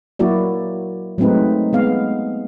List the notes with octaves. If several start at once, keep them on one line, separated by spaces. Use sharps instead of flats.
F#3 A#3 E4 F#4 D5
F#3 G#3 A3 C4 D#4 B4
G#3 B3 F5